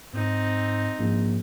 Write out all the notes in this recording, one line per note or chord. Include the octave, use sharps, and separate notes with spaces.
G#2 C4 D#4
A#1 G#2